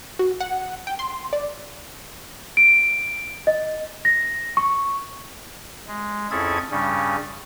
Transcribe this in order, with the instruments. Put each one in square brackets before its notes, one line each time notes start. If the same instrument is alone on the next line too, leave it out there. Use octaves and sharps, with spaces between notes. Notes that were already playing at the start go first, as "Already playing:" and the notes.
[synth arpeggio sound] F#4
F#5
G5
C6
D5
[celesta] D7
D#5
A#6
C#6
[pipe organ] G#3
F2 C#4 E4 G#4 A4 G#6
G2 C#3 G3 C#4